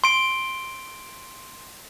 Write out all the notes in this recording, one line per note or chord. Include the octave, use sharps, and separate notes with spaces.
C6 D7